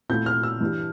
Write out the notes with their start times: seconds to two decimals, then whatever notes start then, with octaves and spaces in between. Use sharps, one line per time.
0.09 A#2 A3 C4 E4 G6
0.26 F6
0.43 E6
0.61 G2 E3 G3 D4